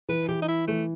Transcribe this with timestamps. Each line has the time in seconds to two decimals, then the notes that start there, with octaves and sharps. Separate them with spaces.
0.09 E3 B4
0.28 E3 G4
0.42 D#4
0.48 E4
0.67 E3 A3